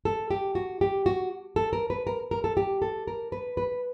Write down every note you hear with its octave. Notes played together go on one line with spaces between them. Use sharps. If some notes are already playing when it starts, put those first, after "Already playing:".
A4
G4
F#4
G4
F#4
A4
A#4
B4
A#4
A#4
A4
G4
A4
A#4
B4
B4